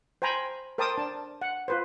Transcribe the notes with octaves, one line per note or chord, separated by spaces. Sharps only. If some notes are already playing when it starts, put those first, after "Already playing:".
C5 G5 G#5 A#5 B5
A#4 C5 G5 A5 D6 D#6
D4 A5
F#5
F4 B4 C5